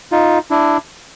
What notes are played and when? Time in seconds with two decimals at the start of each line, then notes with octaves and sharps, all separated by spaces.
0.12 D#4 F4
0.50 D4 E4